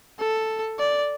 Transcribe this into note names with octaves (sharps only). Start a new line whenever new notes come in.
A4
D5